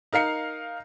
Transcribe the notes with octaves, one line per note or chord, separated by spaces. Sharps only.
D#4 A#4 F5 C7 C#7